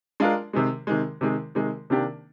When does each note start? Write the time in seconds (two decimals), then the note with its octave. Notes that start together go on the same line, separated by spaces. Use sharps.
0.20 G#3 D4 F4 A#4
0.53 C3 D#3 G#3
0.87 C3 D#3 G#3
1.21 C3 D#3 G#3
1.55 C3 D#3 G#3
1.90 C3 D#3 A#3 D4 G4